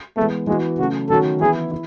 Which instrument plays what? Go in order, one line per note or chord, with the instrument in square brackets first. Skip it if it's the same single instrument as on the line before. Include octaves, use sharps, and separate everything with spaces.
[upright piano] E3 G#3 B3 [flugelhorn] A3
[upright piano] E3 B3 F#4 [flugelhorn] G#3
[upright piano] C#3 F#3 A3 [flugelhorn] F#4
[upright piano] D#3 F#3 A3 C#4 F#4 [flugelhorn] A4
[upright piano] E3 B3 E4 [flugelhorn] G#4
[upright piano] E4